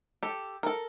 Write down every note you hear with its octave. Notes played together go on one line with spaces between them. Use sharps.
G4 A4
A4 A#4